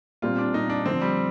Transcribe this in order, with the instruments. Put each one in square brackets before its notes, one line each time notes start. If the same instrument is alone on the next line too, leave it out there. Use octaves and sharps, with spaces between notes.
[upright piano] A#2 G3 C4 [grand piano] F4
[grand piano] D4
[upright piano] A#2 G3 C4 [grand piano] D#4
[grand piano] D4
[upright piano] D3 F3 A3 D4 A4 [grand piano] C4
[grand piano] G3